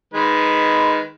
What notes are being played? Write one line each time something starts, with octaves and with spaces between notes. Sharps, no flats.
D#3 G#3 B4